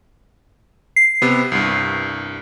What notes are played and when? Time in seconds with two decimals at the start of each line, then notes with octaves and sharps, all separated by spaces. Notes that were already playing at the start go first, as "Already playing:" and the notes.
0.96 C7
1.22 C3 B3
1.52 C2 G2